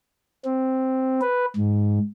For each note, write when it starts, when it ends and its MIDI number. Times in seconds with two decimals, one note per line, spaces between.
0.45 1.21 60
1.21 1.46 71
1.56 1.99 44